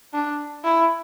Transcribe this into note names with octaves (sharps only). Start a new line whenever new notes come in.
D4
E4